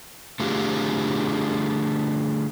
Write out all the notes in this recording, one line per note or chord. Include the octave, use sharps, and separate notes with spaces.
D3 A3 F4 G4 G#4